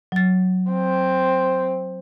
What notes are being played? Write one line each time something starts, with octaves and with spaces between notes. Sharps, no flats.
F#3 A6
C4